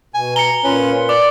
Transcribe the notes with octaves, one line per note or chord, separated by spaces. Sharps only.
B2 G#5
A#5 C#7 G7
A#2 C#4 F4 B4
D5 D6